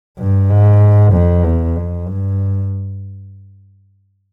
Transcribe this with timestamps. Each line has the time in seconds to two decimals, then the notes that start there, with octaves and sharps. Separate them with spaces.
0.19 G2
0.50 G#2
1.13 F2
1.45 E2
1.76 F2
2.07 G2